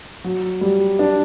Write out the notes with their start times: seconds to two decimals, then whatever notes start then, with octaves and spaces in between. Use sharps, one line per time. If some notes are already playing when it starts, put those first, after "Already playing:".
0.24 F#3
0.61 G3
0.99 D4